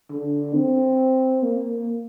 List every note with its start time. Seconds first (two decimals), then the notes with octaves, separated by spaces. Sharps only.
0.11 D3
0.55 C4
1.43 A#3